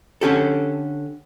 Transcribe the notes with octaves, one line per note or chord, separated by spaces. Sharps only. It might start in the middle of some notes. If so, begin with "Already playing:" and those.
D3 C#4 G4 A4